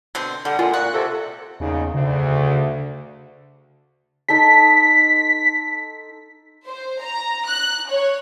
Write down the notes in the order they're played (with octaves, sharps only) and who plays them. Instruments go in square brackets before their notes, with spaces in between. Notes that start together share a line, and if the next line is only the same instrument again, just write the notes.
[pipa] B2 D3 C4
[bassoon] D3 [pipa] G3 [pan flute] F#5
[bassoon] A#2 [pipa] G#3 [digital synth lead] F4
[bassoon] A#2 [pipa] F#4 [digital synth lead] F#6
[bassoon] C3 [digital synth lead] A4
[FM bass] E2 [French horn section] A#2 C#3 D#4
[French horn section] D2 [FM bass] C#3
[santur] D#4 A4 C6 [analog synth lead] B6
[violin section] C5
A#5
F#6
C#5